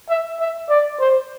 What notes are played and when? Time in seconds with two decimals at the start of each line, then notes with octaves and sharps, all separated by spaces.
0.09 E5
0.40 E5
0.69 D5
1.00 C5